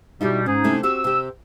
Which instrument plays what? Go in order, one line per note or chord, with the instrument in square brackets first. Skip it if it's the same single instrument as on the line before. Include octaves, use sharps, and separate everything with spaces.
[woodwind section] B2 G3 [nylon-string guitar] D#4 E4 G4
[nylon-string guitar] G#2 [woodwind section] C#4 D#4 G#4
[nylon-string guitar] C3 A3 E4
[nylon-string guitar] C4 F#4 G4 [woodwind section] E6
[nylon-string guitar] C3 G4